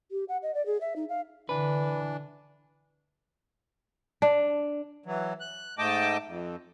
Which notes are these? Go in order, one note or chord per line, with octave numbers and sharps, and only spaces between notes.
G4
F#5
D#5
D5
G#4
E5
D#4
F5
D3 E3 D4 B4
D4
E3 F#3
F#6
G#2 A3 D#5 G5 A5 D6
F2